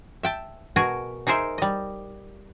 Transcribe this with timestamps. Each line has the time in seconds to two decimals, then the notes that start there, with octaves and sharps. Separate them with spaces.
0.23 E5 G5 A5
0.76 B2 F#4 G#4 A#4 G#5 A#5
1.27 D#4 G#4 A#4 C5 E5
1.58 G3 D#5